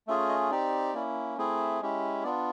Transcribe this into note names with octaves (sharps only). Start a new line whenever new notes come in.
A3 C#4 F4 G#4 E5
D#5
C4 D#4 G4 D5
A#3 C#4 E4
A3 C4 E4 G#4
G#3 C#4 E4 G4
B3 D4 F4 D5